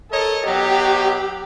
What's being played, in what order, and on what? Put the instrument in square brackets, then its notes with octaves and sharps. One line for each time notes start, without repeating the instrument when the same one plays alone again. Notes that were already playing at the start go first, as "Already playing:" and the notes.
[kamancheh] A4 [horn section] A#4 C#5 D#5
[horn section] B2 F#3 [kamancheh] G4